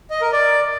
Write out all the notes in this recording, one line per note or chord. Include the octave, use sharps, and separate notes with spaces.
D#5
A#4
D5